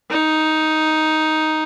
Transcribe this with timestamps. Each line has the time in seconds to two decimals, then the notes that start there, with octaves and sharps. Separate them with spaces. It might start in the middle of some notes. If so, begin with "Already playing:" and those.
0.10 D#4